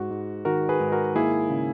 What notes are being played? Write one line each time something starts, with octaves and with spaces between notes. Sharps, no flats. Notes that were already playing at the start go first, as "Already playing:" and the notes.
Already playing: G#2 F#4
G#2
D#3 F#4 A#4
G#4 B4
G#2
F#4 A#4
A#3 E4 G#4
C#3